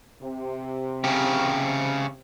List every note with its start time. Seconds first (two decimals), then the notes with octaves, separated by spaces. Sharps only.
0.22 C3
1.04 C#3 G4